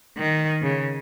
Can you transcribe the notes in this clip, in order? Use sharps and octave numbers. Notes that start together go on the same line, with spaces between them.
D#3
C#3